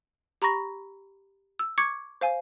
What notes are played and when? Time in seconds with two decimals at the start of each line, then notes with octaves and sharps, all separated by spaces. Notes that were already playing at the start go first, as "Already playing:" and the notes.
0.42 G4 A#5 B5 C#6 A#6
1.59 E6
1.78 C#6 D6 G#6 C#7
2.21 C5 F5 G#5